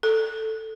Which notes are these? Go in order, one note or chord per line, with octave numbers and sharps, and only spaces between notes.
A4